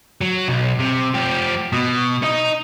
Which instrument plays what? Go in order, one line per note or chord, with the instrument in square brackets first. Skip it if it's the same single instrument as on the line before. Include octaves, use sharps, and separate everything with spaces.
[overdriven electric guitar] F#3
B1
C3
F3 G4
B2
D#4 D#5